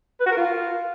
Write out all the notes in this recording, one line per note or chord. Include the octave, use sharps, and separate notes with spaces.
B4
F#4
A#4
F4